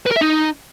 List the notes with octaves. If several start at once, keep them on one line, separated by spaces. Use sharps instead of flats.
B4
A#4
E5
D#4